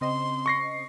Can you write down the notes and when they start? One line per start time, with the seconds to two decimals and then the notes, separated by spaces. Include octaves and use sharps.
0.01 C#3 C4 D#5 C6
0.46 C#6 A#6 C7